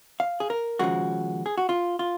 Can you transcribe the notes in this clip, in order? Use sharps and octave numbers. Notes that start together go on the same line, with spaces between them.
F5
G#4
A#4
D#2 C#3 F3 G#3 F#4
G#4
F#4
F4
F4